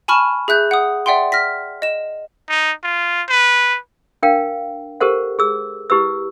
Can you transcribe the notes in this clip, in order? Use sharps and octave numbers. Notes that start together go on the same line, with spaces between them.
G#5 A5 B5 C#6 F6 E7
G#4 E5 F#6 G6
F#5 D#6
D5 E5 F#5 G5 C6
F6 A#6 B6
D#5 E7
D#4
F4
B4
D4 A#4 F5 G5
G4 A4 A#4 C5 F#5
G#4 E6
E4 G4 B4 E6